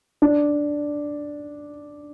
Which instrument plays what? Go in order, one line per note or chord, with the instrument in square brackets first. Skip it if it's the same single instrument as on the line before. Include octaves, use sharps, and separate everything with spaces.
[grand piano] D4